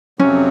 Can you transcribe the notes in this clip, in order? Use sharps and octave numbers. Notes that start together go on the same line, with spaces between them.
F2 C3 F#3 C#4